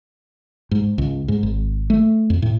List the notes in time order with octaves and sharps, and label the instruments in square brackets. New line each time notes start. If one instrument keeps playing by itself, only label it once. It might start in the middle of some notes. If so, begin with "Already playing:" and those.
[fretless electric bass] G#2
C#2
G#2
G#1
A3
F2
A2